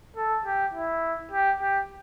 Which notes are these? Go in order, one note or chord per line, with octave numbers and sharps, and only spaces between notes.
A4
G4
E4
G4
G4